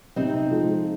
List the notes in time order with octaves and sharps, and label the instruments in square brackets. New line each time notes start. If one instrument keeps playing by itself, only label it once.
[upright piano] C3 [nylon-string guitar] C4 D#4
[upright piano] F3 G#3